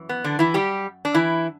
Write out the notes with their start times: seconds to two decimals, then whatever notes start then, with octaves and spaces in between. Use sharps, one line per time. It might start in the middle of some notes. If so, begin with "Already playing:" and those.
Already playing: F#2 E3
0.09 B3
0.24 D3 D4
0.39 E3 E4
0.54 G3 G4
1.05 D4
1.14 E3 E4